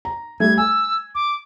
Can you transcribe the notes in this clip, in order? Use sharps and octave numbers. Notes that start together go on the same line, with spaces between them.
A#5
G3 A3 G#6
G#5 E6
D6